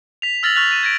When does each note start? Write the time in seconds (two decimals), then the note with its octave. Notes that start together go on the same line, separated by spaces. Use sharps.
0.22 B6 F7
0.43 E6 F6 A6 A#6 F7 F#7
0.55 C#6 F6 F#6 A6 B6 F7
0.71 A6 D#7 E7
0.83 G#6 A#6 D7